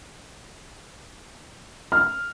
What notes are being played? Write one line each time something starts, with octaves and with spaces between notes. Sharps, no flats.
F6